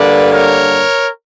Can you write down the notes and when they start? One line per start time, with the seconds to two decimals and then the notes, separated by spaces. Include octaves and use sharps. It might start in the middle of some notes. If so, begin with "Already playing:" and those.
Already playing: G2 D3 A#3 B4 D5
0.32 A#4 C#5